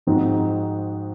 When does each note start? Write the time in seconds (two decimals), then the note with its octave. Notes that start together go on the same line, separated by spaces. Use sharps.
0.07 G#2 F3 C4 D#4 F#4